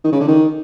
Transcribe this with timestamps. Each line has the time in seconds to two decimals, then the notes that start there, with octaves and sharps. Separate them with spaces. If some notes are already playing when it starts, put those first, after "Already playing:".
0.04 D#3
0.12 C#3
0.20 D3
0.28 D#3